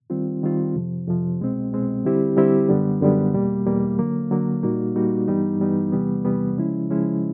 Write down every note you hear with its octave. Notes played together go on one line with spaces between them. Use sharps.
D#3 G3 C4 F4
D#3 G3 C4 F4
F2 C3 F3
F2 C3 F3
C2 B2 G#3 C4
C2 B2 G#3 C4
D3 G3 C4 E4 G4
D3 G3 C4 E4 G4
F#2 D3 G3 B3
F#2 D3 G3 B3
E2 B2 G3 A#3
E2 B2 G3 A#3
D3 F#3 A#3
D3 F#3 A#3
A#2 G3 A#3 D#4 F#4
A#2 G3 A#3 D#4 F#4
G2 E3 G3 B3 D#4
G2 E3 G3 B3 D#4
E2 C3 E3 G3 B3
E2 C3 E3 G3 B3
C#3 F3 G#3 C#4 E4
C#3 F3 G#3 C#4 E4